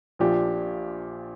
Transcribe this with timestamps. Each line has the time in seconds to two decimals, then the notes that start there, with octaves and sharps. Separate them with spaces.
0.19 A#1 A#2 F3 D4 G4